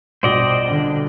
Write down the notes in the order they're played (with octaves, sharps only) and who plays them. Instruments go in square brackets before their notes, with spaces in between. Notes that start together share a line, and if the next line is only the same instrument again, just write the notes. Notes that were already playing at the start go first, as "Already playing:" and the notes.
[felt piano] A#1 G2 B2 [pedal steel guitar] C5 D5 D#5
[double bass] D3